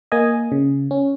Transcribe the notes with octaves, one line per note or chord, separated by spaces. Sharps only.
A#3 D#5 G#5
C#3
C#4